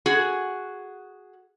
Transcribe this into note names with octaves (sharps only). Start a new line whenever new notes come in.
F#4 G#4